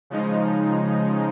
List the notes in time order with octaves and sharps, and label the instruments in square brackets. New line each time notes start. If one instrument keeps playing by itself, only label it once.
[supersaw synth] C#3 F3 G#3 D#4